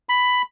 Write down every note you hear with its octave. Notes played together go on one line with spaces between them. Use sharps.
B5